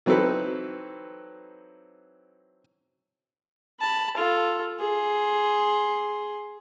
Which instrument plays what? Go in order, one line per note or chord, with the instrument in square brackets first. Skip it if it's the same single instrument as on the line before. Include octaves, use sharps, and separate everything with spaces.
[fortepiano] E3 F#3 C4 D#4 A4 B4
[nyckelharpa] A5 B5
F4 A4
G#4 C6